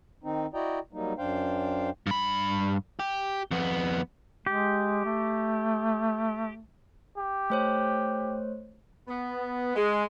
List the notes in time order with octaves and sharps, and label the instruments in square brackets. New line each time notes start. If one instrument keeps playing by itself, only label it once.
[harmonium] D#3 C4 D#4
E4 F#4 D5 D#5 G5 A#5
F#3 G3 A#3 D#4
F#2 D4 C5 F5 G5
[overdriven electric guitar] G2 B5
G4
F2 B3
[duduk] G#3 [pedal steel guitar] G4
[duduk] A3
[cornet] G4
[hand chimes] A3 C5 C#5
[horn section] B3
G#3